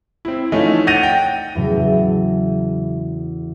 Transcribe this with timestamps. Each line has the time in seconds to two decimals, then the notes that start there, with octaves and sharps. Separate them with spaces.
0.25 C4 E4
0.52 E3 F3 A3 C#4 D#4
0.87 F#5 G6 A6 A#6 D#7 F7
1.03 G5
1.55 E2 A2 C#3 F#3 A3